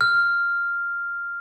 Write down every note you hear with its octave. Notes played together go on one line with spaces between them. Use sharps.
F6